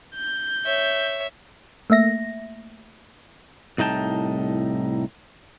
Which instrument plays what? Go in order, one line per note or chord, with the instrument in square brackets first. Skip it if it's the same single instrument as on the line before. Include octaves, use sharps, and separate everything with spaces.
[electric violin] G6
[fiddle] C#5 E5
[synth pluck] A3 A#3 E5 A#6
[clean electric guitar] C2 A2 D#4 G5 A5